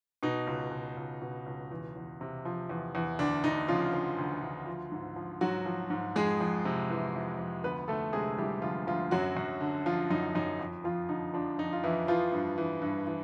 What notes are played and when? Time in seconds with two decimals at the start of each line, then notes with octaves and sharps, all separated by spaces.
0.23 B2 D#4
0.47 C#2
0.71 B2
0.97 C#2
1.22 B2
1.46 C#2
1.71 E2
1.96 E2
2.21 C3
2.45 F3
2.69 E2
2.95 E2
3.19 D2 D4
3.44 D2 D#4
3.68 C#3 F3 F4
3.93 F3
4.18 D2
4.42 D2
4.67 F3
4.92 G#2
5.16 F3
5.41 G#2 F#3 F#4
5.66 F3
5.90 G#2
6.16 F2 G#3 G#4
6.40 F2
6.65 C3
6.90 E3
7.15 F2
7.39 F2
7.64 D2 B3 B4
7.88 D2 A3 A4
8.13 C3 G#3 G#4
8.38 E3 G3 G4
8.62 D2 F3 F4
8.87 D2 F3 F4
9.11 F#2 F#3 F#4
9.37 F#2
9.61 D3
9.86 F3 F4
10.10 F#2 D#4
10.35 F#2 D#4
10.59 F2
10.84 F2 F3 F4
11.09 D3 D#4
11.34 F3 D4
11.58 F2 D#4
11.73 F4
11.84 F2 E3 E4
12.08 E3 F3 F4
12.32 G2
12.58 E3
12.82 G2
13.07 E3